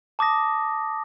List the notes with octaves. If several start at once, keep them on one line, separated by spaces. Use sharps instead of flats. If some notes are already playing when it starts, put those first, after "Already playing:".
A5 D6 D#6 A#6